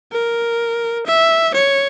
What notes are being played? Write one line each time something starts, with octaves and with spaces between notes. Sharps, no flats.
A#4
E5
C#5